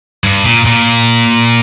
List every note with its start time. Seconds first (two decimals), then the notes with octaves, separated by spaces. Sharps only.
0.24 G2
0.45 A#2
0.65 A#2